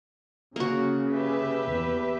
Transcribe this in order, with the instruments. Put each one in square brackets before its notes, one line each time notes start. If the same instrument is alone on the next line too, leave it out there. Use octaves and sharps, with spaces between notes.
[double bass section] C#3 [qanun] A#3 F#4
[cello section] G4 B4 E5
[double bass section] E2